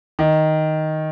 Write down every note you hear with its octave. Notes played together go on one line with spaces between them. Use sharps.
D#3